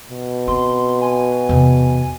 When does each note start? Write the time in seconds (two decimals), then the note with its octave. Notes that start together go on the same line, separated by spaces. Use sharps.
0.11 B2
0.47 C4 C6
1.02 G#5
1.49 E2 C3